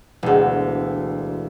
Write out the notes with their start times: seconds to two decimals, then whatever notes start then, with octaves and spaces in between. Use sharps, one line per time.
0.23 E1 D2